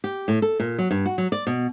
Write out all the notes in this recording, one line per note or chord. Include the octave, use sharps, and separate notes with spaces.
G4
A2
A4
A#2
F#3
G2
F#4
F#3
D5
B2